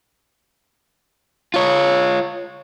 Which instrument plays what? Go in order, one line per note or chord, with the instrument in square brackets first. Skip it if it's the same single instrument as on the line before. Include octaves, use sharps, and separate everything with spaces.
[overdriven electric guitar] F4 C#5